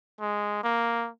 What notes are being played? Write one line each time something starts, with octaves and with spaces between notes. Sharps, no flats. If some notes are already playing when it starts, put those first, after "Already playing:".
G#3
A#3